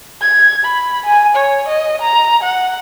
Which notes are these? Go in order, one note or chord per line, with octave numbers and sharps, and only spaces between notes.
G#6
B5
G#5
C#5
D#5
A#5
F#5